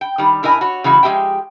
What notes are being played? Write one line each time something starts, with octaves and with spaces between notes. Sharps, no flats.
G5
D#3 G3
A2 E4 A#4 D#5 G#5
F#4 C#5
C#3 E3 G#3 F#4
F3 G#3 E4 G4 E5 G5